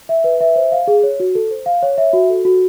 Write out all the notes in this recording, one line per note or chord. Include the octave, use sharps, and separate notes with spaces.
E5
B4
E5
C5
F5
G#4
C#5
F#4
A4
C5
F5
C#5
E5
F#4
A4
F#4